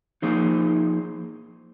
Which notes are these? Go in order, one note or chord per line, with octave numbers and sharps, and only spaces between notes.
F3 A#3 D#4 G#4 C5